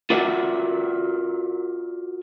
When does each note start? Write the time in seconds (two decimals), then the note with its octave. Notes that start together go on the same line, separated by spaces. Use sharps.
0.10 F4 F#4 A#4 D5 E5 F#5